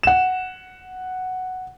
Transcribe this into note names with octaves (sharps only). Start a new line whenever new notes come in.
F#5 E7